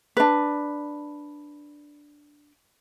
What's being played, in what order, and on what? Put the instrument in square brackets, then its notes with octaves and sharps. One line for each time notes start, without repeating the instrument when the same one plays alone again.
[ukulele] D4 B4